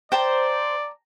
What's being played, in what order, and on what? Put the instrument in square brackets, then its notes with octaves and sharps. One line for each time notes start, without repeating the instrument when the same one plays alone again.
[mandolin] C5 [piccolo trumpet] D5 [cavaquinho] G5 A5 A#5